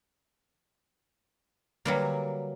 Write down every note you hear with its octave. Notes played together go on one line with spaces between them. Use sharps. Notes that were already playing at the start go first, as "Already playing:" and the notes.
D3 F#3 G3 A#3 B4